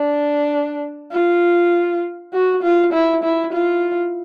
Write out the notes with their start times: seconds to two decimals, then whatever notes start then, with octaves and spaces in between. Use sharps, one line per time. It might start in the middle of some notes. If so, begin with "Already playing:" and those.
Already playing: D4
1.12 F4
2.34 F#4
2.63 F4
2.93 E4
3.24 E4
3.53 F4